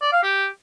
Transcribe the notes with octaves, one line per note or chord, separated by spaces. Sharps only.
D5
F5
G4